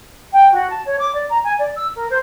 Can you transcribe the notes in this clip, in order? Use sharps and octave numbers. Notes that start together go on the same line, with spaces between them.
G5
F#4
A5
C#5
D6
D5
A#5
G#5
D5
E6
A#4
C5